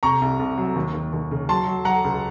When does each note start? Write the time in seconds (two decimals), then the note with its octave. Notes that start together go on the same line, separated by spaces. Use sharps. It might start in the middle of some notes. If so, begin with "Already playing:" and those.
0.03 C3 A#5 C#6
0.21 C2
0.39 C2
0.58 F#3
0.76 D#2
0.94 D#2
1.13 D#2
1.31 C#3
1.49 F#3 A5 C6
1.67 F#3
1.85 F#3 F#5 A#5
2.04 C#2